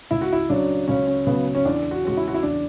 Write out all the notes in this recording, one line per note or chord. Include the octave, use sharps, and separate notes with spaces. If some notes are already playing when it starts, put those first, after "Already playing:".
C#2 E4
F#4
E4
C#3 F#3 D4
C#2 C#4
C#4
C#3 F#3 B3
C#4
E2 D4
F#4
C#3 G#3 C#4 F#4
E4
F#4
E4
E2 D4